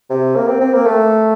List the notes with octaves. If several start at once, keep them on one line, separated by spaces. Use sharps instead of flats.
C3
A#3
C4
C4
A#3
A3